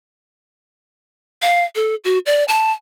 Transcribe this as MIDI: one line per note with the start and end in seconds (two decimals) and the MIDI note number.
1.42 1.64 77
1.75 1.95 69
2.04 2.19 66
2.26 2.44 74
2.48 2.72 81